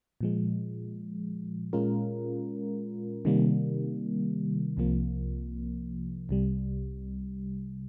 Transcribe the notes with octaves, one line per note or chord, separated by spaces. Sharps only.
A#2 F3 G#3
A#2 G#3 C#4 F4 A#4
C3 D#3 G3 A#3
C2 C3 F3 A#3
C2 C3 G3